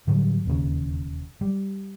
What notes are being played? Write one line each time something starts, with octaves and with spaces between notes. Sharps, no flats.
A2 D3 F#3 G3
E1 D#2 C#3
G3